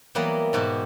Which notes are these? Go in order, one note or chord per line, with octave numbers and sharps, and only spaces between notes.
E3 F#3 G3 A#3 B3
G#2 B2 F#4 G4